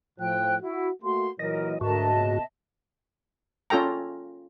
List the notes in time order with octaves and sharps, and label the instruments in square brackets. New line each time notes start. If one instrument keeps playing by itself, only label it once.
[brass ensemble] A2 F3 [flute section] G5 F#6
[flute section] E4 [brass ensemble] F#4
[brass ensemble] A3 A#3 F#4 [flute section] C6
[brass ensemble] A#2 E3 F#3 [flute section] A#4 [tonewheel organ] D#5
[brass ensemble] D2 A#4 [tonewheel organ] G#2 F#4 [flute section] D#5 E5 A5
[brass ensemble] A#2 C#3 B3
[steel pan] C#4 F4 A4 G5 A#5